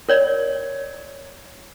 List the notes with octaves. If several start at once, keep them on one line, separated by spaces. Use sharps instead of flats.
A#4 C#5 D5